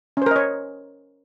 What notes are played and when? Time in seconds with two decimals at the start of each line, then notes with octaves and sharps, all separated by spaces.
0.17 C#4
0.22 C5
0.26 A#4
0.31 D#5
0.36 C#5